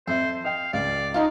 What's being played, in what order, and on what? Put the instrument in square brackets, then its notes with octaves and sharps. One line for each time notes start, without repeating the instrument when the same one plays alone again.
[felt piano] F2 E5 [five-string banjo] A4 [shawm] C5
[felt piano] D#5 G5 [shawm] F5
[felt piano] C#2 [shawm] D5 [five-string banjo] F5
[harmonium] D#4 [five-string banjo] F4 F5 A5